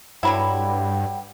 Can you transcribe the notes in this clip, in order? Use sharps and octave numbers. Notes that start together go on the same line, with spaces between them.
G2 D3 F#3 E4 F#5 G5 B5